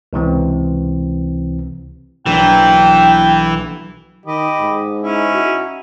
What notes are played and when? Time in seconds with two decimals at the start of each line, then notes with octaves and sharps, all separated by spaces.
0.13 C#2 C3 E3 C4
2.26 B1 E3 A#3 D4 G5
4.26 D#3 G4 D#5 B5
4.60 G#2
5.01 C#4 D#4 E4
5.34 F#4